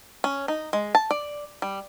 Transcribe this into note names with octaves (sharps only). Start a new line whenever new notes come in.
C#4
D#4
G#3
A5
D5
G3